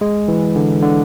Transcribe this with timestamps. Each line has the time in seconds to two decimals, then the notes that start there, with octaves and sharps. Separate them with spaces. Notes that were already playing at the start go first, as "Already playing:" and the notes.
0.01 G#3
0.28 E3
0.56 D3
0.82 D3